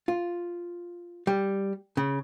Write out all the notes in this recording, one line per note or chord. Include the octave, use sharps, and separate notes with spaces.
F4
G3
C#3